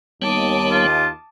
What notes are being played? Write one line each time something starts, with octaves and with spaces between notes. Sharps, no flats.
D#2 G3 B3 C#5 A5 D6 D#6
F4